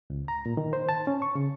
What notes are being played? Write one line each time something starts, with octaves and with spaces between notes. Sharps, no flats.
C#2
A#5
A#2
D#3
C5
A5
C#4
C#6
C#3